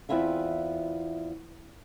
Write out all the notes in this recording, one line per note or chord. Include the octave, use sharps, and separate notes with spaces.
E2 B3 C4 E4 F4 E5